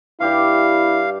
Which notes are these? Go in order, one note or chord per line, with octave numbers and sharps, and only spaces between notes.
G2 E4 G4 D5 F5